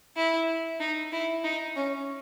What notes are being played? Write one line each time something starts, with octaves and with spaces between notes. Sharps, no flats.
E4
D#4
E4
D#4
C#4